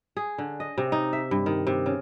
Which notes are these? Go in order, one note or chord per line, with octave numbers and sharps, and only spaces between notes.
G#4
D3
D#5
C3
D#4
E5
G2
D#3
C3
C#3